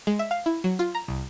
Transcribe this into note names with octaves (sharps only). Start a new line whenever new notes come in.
G#3
E5
F5
E4
F#3
F4
A#5
C2